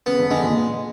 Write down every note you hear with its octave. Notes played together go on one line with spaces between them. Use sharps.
C#3 B3
D3
D3 G#3
A#2